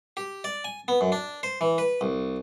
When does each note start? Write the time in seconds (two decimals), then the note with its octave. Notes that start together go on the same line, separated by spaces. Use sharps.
0.17 G4
0.44 D5
0.64 G#5
0.88 B3
1.01 F#2
1.12 D4
1.43 C5
1.61 E3
1.78 B4
2.01 C2